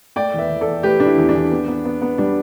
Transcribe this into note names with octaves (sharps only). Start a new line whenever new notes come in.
A3 D5 G5
E2 B4 E5
E2
A4 D5
E2
A3 G4 B4
D4
E4
E2
D4
E2
B3
B3
B3
B3
G3 D4